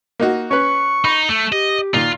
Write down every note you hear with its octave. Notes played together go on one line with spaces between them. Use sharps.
A#3 D#4 F#4
C#4 B4 C#6
D#4 B5
A3
G4 D#5
A#2 D#3 F4